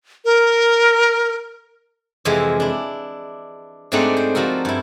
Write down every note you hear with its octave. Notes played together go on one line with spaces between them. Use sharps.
A#4
F2 C3 E3 G#3
D4 E4
G#2 A3 C4 D4 D#4 F#5
C5
F3 F#4 A4 A#4
G2 E4